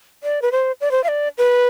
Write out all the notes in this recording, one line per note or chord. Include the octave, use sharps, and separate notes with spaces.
D5
B4
C5
D5
C5
F5
D5
B4